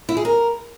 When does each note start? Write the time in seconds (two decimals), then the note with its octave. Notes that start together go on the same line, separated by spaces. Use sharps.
0.09 E4
0.17 G#4
0.25 A#4